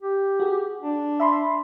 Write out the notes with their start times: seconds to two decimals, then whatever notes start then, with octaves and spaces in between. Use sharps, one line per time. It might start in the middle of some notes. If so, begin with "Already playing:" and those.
0.02 G4
0.40 F#4 G#4
0.82 D4
1.20 E5 B5 C6